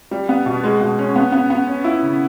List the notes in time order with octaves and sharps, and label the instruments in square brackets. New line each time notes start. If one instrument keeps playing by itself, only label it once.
[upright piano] G3
B3
B2
G#3
B2
C#4
B3
B3
B3
C#4
E4
C#3